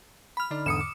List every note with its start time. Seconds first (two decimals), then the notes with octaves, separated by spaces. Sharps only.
0.37 B5 F6
0.51 D3 D#4 D5
0.66 E2 G#2 D3 D#6 C#7 E7
0.81 D6